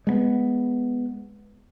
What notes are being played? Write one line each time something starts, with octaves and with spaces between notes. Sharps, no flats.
G#3 A3 B3